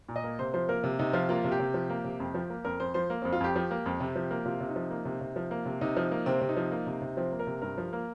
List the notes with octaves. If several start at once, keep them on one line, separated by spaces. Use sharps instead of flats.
A#2
D#5
A#3
C3 C5
F3 C5
A#3 A#4
C3
C3 D#4
F3 F4
A#3 F4
C3
G4
C3
F3
A#3
C3
F2
F3
A#3
F2 A#4
F2 C5
F3 C5
A#3
F2 C4
F4
F2 G4
F3
A#3
F2
C3
F3
A#3
C3 F4
C3
D#4
F3
A#3
C3
C3
F3
A#3
C3
C3 D#4
F3
A#3
C3 C4
C3
D#4
F3
A#3
C3
C3
F3 C4
A#3
A#4
C3
G2 A#4
F3
A#3